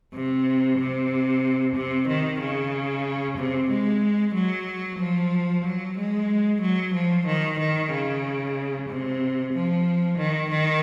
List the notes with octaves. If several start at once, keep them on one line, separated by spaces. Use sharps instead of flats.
C3
C3
C3
D#3
C#3
C3
G#3
F#3
F3
F#3
G#3
F#3
F3
D#3
D#3
C#3
C3
F3
D#3
D#3